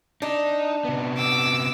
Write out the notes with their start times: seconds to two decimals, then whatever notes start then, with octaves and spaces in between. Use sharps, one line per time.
0.22 D4 D#4
0.85 C3 B3
1.17 D6 E6